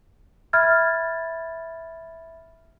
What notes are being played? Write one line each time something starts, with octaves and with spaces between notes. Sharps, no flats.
E5 B5 F6 G#6 A6